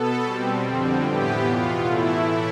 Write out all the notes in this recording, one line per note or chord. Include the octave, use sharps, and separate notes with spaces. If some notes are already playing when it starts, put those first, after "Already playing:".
Already playing: B2 B3 A4
B2 G3 C4
F2 D3 G3 C4
A2 E3 B3 G4
E2 B2 B3 F4
A2 E3 A3 E4